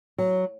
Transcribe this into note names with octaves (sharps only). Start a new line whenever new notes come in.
F#3